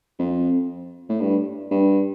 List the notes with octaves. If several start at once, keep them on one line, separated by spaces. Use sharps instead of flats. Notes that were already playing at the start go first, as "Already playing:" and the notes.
F2
A2
G2
G2